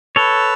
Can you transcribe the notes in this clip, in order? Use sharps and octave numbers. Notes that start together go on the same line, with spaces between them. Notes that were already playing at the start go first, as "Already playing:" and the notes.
A4 B4 C#5